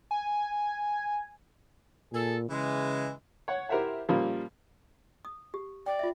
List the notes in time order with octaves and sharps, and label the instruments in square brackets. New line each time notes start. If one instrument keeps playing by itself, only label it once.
[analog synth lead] G#5
[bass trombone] A#2 [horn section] G#4 A4
[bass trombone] C#3 [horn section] E3 G#3
[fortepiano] C#5 F#5
E4 G4 A#4 C5 E5 F#5
A#2 C#3 F3 G3 A#3 F4
[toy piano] D#6
G4
[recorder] D5 [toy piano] G5
[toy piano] F4 E5